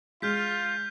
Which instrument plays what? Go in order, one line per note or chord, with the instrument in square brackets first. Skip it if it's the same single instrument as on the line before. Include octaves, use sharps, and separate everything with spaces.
[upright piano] G#3 [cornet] F4 [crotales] F6 G6 B6